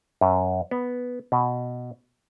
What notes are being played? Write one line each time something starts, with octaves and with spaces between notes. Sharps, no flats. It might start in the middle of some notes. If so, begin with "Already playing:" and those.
F#2
B3
B2